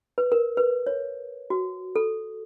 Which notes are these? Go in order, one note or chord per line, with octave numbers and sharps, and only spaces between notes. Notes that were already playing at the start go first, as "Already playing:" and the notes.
B4
A#4
B4
C#5
F#4
A4